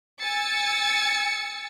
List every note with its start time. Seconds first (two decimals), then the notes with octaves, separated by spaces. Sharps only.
0.20 G#5 E6 A6 C#7